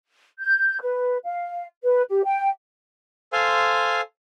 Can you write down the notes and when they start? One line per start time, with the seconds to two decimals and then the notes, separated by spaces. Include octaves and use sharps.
0.39 G6
0.81 B4
1.25 F5
1.84 B4
2.09 G4
2.24 G5
3.33 A4 C5 F5 G#5 C6